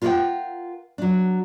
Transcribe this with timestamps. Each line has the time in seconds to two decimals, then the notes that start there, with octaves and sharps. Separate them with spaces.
0.02 F4 A#4 C5 D5 F#5 G5
0.98 F#3 D4